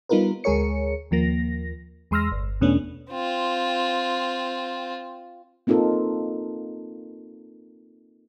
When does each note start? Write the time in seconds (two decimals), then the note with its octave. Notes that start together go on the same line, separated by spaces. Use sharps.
0.09 G3 B3 D#4 F4 A#4 B4
0.44 D2 G#3 G#4 A#4 C#5 C#7
1.11 D#2 F3 A#3 A#6
2.11 E2 G#3 C6 E6 F6 A#6
2.32 G1
2.61 E2 B2 A3 B3 C#4 D4
3.11 C4 F4
5.67 A#3 C4 D#4 F4 A4 A#4